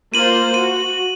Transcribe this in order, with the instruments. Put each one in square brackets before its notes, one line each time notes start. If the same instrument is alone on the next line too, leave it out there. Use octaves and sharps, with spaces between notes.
[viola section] A#3 F4 C5 [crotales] D#7 F#7
[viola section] F#4 [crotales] D#7